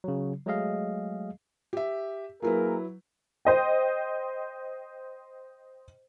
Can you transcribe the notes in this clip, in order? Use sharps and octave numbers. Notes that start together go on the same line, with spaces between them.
C#3 F#3
F#3 G#3 A3 G#4 D#5 F5
G4 E5
F#3 A#3 E4 G#4 A#4 B4
C5 D#5 G5